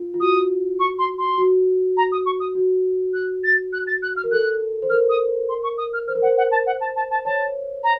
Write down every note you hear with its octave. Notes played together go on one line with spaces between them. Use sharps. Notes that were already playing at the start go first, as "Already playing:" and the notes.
Already playing: F4
F4
F#4 D#6
C#6
C6
C6
F#4
A#5
D#6
C#6
D#6
F#4
F#6
A6
F#6
A6
F#6
F6
A#4
A4 F#6
C5
A#4 F6
D#6
C6
C#6
D#6
F6
C5 F6
A#4
C5 F#5
F#5
A5
F#5
A5
A5
A5
C#5 A5
A#5